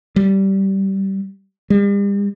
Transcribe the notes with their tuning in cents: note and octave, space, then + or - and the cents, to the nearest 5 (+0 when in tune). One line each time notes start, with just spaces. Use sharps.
G3 -15
G3 +40